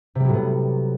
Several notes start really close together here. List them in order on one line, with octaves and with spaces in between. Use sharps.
C3 G3 F#3 A2 B3